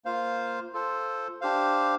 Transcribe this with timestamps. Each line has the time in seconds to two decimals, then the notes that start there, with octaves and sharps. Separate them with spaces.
0.05 A#3 F4 C5 F5
0.73 F4 A4 C5
1.41 D4 G4 C5 F5